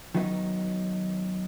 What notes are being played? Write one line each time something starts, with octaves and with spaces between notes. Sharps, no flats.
D#3 F#3 B3 D#4